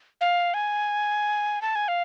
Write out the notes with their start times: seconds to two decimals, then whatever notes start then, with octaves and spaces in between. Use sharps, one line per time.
0.21 F5
0.54 G#5
1.62 A5
1.75 G#5
1.88 F5